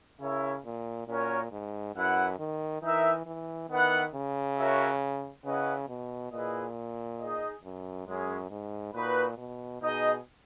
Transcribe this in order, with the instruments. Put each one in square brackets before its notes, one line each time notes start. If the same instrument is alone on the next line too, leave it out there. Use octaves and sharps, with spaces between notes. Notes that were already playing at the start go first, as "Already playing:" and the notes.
[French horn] C#3 [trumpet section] E4 A#4 C#5 E5
[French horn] A#2
[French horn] A#2 [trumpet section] C#4 F#4 A#4 C#5
[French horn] G#2
[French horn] F#2 [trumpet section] E4 B4 F#5
[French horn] D#3
[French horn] E3 [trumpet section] D#4 A#4 E5
[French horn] E3
[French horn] D#3 [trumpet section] B3 E4 B4 F#5
[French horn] C#3
[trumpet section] F#4 A#4 C#5 E5
[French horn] C#3 [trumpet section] C#4 E4 B4 D#5 F#5
[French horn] B2
[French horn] A#2 [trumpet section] E4 G#4 B4 D#5
[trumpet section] D#4 G#4 D#5
[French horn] F#2
[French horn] F#2 [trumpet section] G#3 C#4 G#4
[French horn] G#2
[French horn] A#2 [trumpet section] D#4 F#4 B4
[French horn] B2
[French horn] B2 [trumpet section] D#4 G#4 D#5